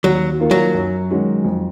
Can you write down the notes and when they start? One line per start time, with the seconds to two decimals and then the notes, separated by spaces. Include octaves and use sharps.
0.04 D#2 F#3
0.40 D#3 A#3 F4
0.51 F#3
0.74 F#2
1.10 D#3 G#3 C#4 F#4
1.45 F2